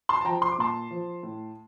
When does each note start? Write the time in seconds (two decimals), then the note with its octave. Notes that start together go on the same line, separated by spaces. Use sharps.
0.09 A5 C6
0.21 A5
0.25 F3 G5 A#5
0.42 C6
0.51 D6
0.59 A#2 A5 C6
0.91 F3
1.23 A2